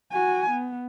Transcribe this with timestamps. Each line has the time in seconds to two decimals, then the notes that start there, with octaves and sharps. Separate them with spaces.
0.13 F#4 G#5
0.50 B3